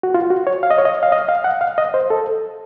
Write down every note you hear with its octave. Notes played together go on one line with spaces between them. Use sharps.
F#4
F4
F#4
C#5
F5
D#5
C#5
D#5
F5
D#5
F5
F#5
F5
D#5
C5
A4